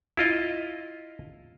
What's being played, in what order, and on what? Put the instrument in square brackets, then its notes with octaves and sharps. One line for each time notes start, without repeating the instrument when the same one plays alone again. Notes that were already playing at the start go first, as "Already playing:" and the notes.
[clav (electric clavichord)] E4 F4 D#5